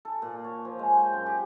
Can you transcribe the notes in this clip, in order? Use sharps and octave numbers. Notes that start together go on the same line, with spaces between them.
A4
A#2
C#5
F3
G#3
G5
F#2
G4